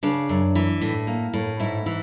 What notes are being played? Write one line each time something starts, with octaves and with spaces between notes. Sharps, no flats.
C#3 D4
F#2
E3
A2
A#3
A2
G#2 E4
E3